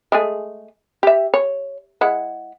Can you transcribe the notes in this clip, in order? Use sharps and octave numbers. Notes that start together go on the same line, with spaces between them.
G#3 A3 G#4
G4 E5
C#5
G#3 E4 F#5